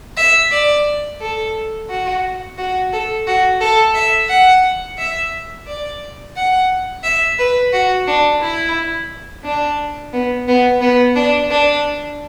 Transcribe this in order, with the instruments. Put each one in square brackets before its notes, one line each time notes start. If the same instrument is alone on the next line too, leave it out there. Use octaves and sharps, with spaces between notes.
[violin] E5
D5
A4
F#4
F#4
A4
F#4
A4
E5
F#5
E5
D5
F#5
E5
B4
F#4
D4
E4
D4
B3
B3
B3
D4
D4